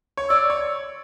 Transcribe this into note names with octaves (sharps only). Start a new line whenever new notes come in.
C#5
D5 E6
C#5